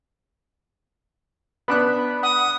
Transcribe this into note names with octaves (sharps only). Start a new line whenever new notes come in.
B3 D4 B5 F#6
F#5 D#6